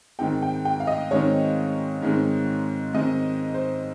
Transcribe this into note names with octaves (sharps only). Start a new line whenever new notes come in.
G#2 D#3 G#3 C4 D#4 G5
G5
G5
F5
D#5
G#2 D#3 G#3 C4 D#4 C#5
G#2 D#3 G#3 C4 D#4
G#2 D#3 G#3 C4 D#4 D#5
C5